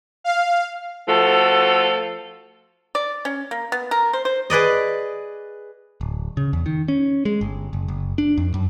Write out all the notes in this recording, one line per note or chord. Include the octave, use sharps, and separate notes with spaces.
F5
F3 A3 F#4 A4
D5
C#4
A#3
B3
A#4
C5
C5
G#4 B4 D5 D#5
D1
C#3
E2
D#3
C#4
G#3
G1
F#1
F#1
D4
F2
F#2